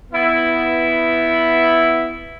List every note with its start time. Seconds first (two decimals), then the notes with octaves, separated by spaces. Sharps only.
0.12 B3 E4